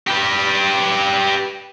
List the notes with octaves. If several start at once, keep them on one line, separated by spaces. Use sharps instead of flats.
G4 B4